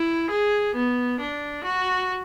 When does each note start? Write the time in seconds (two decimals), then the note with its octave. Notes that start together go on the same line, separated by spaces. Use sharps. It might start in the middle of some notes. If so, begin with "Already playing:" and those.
Already playing: E4
0.31 G#4
0.75 B3
1.20 D4
1.64 F#4